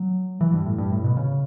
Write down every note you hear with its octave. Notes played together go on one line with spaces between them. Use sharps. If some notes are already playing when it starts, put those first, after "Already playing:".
Already playing: F#3
E3
G2
A2
G2
A2
B2
C#3